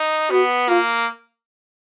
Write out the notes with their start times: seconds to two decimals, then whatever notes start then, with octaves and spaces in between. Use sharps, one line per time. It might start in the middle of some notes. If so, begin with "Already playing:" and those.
Already playing: D#4
0.31 B3 F#4
0.68 A#3 F4